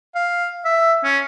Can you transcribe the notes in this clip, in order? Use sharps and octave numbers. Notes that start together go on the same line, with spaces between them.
F5
E5
C#4